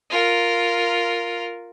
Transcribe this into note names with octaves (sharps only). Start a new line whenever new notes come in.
F4 A#4